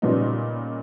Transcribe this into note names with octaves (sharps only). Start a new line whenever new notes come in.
A#2 C#3 G3 B3 C#4 D#4